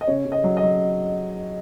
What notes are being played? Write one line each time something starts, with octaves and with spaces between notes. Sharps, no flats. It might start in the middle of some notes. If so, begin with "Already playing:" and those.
D#5
C#3 C#5
C#3
D#5
F#3
D#5
F#3